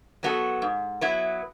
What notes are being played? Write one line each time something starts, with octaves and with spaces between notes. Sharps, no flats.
F#3 B3 F#4 A4
G#2
F#3 B3 E4 B4